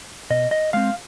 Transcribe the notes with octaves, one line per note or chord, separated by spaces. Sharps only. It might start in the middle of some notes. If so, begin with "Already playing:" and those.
B2 D#5
D#5
G#3 C4 F5